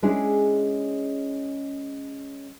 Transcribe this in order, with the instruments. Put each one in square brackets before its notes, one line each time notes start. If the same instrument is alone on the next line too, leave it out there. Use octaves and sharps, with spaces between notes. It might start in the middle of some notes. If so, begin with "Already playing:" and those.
[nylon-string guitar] G#3 C#4 D4 E4 G#4